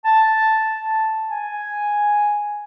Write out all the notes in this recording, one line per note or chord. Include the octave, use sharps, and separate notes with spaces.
A5
G#5